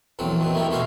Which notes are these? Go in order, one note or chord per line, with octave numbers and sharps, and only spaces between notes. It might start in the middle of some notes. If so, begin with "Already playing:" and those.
A#1 E2 F#3 C4 A4
D#3 B3 C4
A3 A#3 D#4 E4 G4
B2 A3 F#4 A4 C5 F5